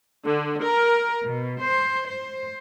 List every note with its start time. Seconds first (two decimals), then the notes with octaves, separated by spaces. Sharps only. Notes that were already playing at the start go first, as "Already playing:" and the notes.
0.28 D3
0.62 A#4
1.25 B2
1.63 C5
2.07 C5